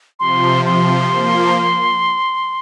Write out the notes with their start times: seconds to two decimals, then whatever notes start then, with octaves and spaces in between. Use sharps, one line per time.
0.20 C3 F3 C6
0.65 C3 F3 C6
1.11 F3 A#3